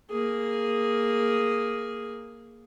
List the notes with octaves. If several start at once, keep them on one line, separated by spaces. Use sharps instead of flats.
A#3 G#4